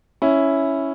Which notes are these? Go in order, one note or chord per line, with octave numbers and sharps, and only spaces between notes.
C#4 E4